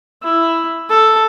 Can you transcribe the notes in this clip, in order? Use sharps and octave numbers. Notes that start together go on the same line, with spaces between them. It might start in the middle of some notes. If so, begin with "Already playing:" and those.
E4
A4